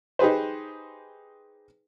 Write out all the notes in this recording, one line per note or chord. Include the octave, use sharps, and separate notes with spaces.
D#4 G4 G#4 B4 C5